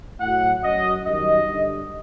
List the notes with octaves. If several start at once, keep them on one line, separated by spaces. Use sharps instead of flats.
A2 F#3 F#5
F#2 F#3 D#5
F#2 D#3 G3 D#5
G2 D3 G3